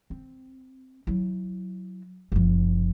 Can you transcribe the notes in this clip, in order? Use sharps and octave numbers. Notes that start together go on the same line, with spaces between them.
C4
F#3 E4
F#1 F3